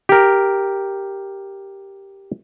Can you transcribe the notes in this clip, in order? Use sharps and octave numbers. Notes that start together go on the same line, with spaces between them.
G4 A#4